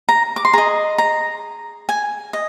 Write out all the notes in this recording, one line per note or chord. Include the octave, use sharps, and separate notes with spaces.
A#5
D6
C6
G#4 D#5 A#5
A#5
G#5
D#5